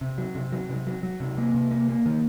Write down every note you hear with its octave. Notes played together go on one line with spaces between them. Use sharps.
C3
F#3
C3
F#3
C3
F#3
F#3
C3
A#3
C3
A#3
A#3
D#3